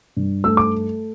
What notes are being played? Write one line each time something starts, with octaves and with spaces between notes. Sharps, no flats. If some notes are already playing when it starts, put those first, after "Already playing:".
G2
A3 E6
D6